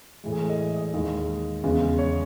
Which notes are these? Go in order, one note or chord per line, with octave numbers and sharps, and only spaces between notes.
A2 E3 G#3
G#4
A4
D#5
D#5
D#2 D#3 G#3 D#5
E2 C#3 G#3
C#5